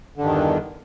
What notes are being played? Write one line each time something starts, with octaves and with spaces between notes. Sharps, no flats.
E2 G2 D3 D#3